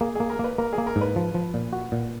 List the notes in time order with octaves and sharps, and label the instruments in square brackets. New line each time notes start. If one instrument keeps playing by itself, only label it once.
[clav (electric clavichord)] A#3 [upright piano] G#4
[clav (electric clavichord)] A#3 [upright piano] G#4
[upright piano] A#4
[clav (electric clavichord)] A#3 [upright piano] B4
[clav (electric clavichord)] A#3 [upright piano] A#4
[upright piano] G#4
[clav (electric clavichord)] A#3
[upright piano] A#4
[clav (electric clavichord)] G#2
[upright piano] B4
[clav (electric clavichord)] F3
F3
A#2
F#4
A#2